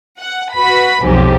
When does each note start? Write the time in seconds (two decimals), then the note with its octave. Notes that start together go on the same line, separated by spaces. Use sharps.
0.19 F#5
0.53 F#4 B4 B5
1.04 B1 F2 G#2 G4